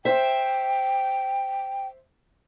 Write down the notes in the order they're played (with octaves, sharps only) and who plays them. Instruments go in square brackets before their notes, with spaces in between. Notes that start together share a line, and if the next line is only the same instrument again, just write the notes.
[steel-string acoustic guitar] C5 E5 [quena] G5